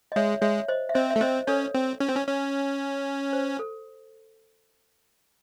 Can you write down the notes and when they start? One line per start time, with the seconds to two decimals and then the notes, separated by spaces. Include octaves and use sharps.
0.12 D#5
0.16 G#3 C#5 E5
0.41 G#3 C#5 E5
0.68 C5 D#5
0.89 E5
0.94 C4 C5 D#5
1.11 E5
1.16 A3
1.21 C4 C5 D#5
1.47 C#4 A4 C#5
1.75 C4
2.00 C#4
2.08 C4
2.15 C#4
2.27 C#4
3.33 C5
3.59 A4